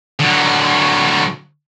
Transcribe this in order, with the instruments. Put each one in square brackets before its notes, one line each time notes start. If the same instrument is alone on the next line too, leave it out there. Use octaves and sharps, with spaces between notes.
[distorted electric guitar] D3 F#3